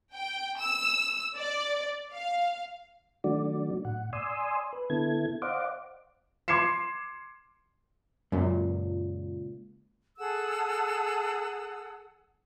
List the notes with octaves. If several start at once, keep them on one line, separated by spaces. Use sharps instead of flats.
G5
E6
D5
F5
D#3 F#3 A3 D4 F#4 D5
A2 F#5
D5 G#5 C6 D#6 E6
B4
D3 B3 E4 A4 G#6
C5 D5 D#5 F5 F#5 D6
C6 D6 G#6 C7 C#7 E7
C#2 F#2 A#2
G#4 A4 F#5 E6